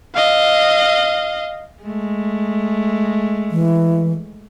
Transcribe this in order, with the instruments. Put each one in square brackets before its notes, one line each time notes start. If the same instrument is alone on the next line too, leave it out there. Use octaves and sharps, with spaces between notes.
[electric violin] D#5 F5
[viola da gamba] G#3 A3
[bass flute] E3